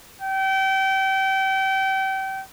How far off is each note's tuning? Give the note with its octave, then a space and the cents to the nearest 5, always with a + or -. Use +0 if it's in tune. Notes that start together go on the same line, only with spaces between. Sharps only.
G5 -30